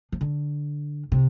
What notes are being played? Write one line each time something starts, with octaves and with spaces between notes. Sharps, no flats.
F3
D3
C3